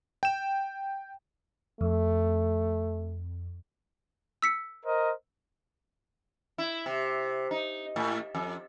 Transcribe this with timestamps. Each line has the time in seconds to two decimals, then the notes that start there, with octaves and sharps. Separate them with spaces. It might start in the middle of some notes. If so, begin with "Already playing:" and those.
0.23 G5 E7
1.81 F2 A3
4.42 E6 B6 C#7
4.85 A#4 C5 D#5
6.58 E4
6.86 C3
7.51 D#4
7.96 A2
8.35 F2